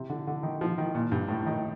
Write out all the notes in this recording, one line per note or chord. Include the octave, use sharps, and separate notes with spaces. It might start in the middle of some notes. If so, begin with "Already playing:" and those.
Already playing: C3
D3
D3
D#3
F3
D#3
A#2
G2
A2
D#3